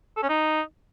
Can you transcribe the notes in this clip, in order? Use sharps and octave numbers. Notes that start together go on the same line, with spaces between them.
A4
C#4
D#4